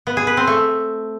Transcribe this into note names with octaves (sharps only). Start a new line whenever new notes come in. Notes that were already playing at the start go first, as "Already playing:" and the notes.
B3
G#4
B4
C4
A3